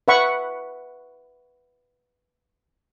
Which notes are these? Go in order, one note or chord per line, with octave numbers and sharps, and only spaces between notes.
B4 E5 F#5 B5 C#6